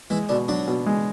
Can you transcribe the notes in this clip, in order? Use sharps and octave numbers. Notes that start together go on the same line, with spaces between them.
E3 G#3 E4
B2 D3 D4
F#3 D4 F#4
B2
G#3